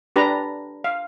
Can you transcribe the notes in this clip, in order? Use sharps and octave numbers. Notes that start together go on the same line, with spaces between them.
D4 G4 B4 A#5
F5